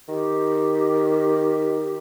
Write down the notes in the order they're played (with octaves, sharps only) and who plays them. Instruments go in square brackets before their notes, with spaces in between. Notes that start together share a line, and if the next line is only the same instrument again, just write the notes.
[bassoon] D#3 [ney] G4